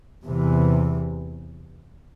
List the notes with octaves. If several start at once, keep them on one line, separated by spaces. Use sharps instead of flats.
E2 C3 E3